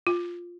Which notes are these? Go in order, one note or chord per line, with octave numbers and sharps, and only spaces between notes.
F4